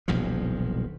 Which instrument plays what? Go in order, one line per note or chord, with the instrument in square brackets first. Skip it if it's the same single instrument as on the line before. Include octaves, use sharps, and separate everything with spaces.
[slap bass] D#1 B1 G2 F3